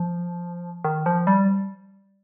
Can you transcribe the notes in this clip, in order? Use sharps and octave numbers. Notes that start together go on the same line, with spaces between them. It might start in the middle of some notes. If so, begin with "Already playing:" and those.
Already playing: F3
D#3
F3
G3